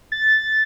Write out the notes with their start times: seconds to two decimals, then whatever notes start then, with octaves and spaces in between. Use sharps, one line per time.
0.12 A6